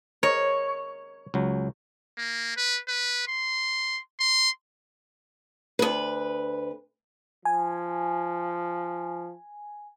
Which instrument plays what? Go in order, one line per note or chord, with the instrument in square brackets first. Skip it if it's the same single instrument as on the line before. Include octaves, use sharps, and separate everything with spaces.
[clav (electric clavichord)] A#4 D#5 [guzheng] C#5
[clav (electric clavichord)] C#2 F#3
[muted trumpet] A#3
B4
B4
C6
C6
[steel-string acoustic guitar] D2 B4
[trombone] F3 [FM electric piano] G#5